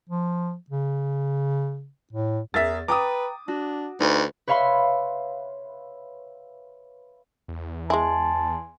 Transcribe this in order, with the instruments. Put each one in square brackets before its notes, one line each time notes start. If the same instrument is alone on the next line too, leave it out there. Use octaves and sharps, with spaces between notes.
[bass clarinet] F3
C#3
A2
[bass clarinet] E2 [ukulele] G#4 A#4 [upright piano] E5 A6
[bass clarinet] B4 [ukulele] G5 A#5 [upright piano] D6 D#6
[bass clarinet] D4 [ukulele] F#4
[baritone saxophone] D2 [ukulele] D#4 [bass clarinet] B4
[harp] B4 C#5 E5 F5 B5 C6
[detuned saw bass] E2
[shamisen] G#3 E4 [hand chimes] G#5 C6 [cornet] A5